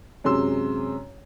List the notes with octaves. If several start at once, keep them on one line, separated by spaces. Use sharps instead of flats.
F#2 C3 G#3 C6 E6